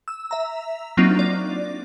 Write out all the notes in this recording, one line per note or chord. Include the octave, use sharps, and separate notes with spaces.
E6
E5 A#5
F#3 A#3 C4 D4 D#4 F4
D5